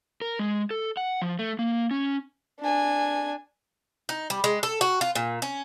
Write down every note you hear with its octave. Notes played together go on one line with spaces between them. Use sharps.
A#4
G#3
A4
F#5
F3
A3
A#3
C#4
D4 G#5
D#4
G3
G#3
A4
F#4
F4
A#2
C#4